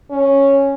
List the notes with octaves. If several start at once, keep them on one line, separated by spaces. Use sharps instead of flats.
C#4